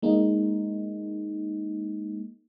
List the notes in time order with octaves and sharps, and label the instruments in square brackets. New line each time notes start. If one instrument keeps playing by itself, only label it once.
[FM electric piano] G#3 A#3 D#4